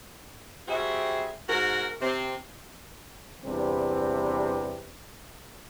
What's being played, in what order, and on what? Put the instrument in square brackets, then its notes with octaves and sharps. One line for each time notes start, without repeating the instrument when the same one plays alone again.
[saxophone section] G3 C4 F#4 G#4 E5
G#2 F#4 A#4
C3 C4
[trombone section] E2 C3 G3 C4 D4 B4